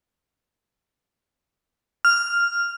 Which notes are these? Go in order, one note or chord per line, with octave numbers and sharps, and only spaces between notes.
F6